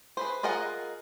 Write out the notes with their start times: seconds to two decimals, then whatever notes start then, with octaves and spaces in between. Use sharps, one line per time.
0.17 G#4 B4 C5
0.43 F4 G#4 A#4 D#5 F#5